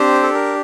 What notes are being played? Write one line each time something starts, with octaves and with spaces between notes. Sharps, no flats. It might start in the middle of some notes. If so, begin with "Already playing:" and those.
Already playing: C4 D4 G4 C5
A4
A#4